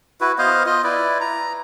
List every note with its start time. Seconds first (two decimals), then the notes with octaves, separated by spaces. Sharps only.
0.21 E4 F#4 B4
0.38 B3 C5 D#5 F5
0.66 F4 D#5
0.84 E4 B4 D5
1.21 A#5